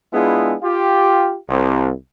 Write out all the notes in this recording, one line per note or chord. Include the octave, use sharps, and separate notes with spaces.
G#3 B3 D4 E4 F4 G#4
F4 G4
C2